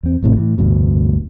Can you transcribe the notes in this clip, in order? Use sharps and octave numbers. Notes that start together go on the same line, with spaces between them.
E2 C4
G#1 A2 C3
A2 E3
F1 D2 G2 B2